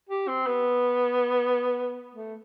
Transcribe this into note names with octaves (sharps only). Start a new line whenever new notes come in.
G4
C4
B3
A3